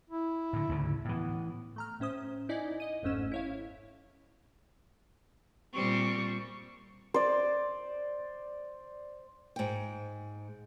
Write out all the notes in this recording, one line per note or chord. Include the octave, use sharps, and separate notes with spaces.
E4
A2 D3
D2 G#2 C#3
A2 E3 B3
A3 A#5 F6
A2 C#4 C5 D#6
D#4 E4 D5 D#5 G#5
D#5 D#7
G1 F2 G#2 A3 C#4 E7
E4 C#5 F5
A#2 G3 C4 C#6
C5 D5
G#2 G5